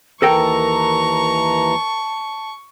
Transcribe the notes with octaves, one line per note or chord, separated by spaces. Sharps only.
D#2 E3 A4 A#4 G5 A5 A#5 C#6